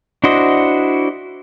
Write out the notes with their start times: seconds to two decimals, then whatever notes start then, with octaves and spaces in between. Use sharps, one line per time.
0.24 D4 E4 F#4 C5 D#5